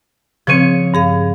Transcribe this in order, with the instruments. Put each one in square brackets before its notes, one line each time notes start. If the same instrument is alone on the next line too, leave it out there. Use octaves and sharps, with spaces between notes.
[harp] C#3 C#5 C#7 [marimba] F3 C4
[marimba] G2 G#4 F5